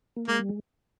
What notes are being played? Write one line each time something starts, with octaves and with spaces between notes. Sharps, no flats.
A#3
G#3 A#3
G3
G#3